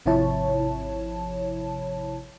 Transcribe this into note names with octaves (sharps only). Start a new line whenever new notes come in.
G#1 C3 F3 E4 C#5 A5